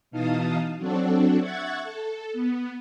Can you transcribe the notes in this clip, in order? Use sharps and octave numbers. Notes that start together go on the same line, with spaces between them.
B2 E3 D#4 F5 A5 D#6
F#3 C4 D4 F#4 A4
E5 F#5 C#6 F#6 G#6 A6
A4
B3